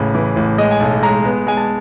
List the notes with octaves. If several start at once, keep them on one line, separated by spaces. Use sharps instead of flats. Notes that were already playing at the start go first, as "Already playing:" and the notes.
Already playing: A1 C#3
E3
A1
G#3 D#5
G#5
B1 A5
G#3 A#5
B3
G#3 G#5
A5